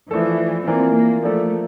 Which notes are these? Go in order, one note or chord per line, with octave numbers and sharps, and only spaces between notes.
E3 F3 A3 D4 A4
E3 A#3 C4 F4 A#4 D5
A#3
F3 A3 A#3 D4 A4 D5